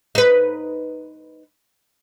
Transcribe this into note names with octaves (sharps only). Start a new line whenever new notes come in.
D#4 B4